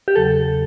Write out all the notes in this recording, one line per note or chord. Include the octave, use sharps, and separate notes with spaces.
G4
E2 C#3 F#3 A4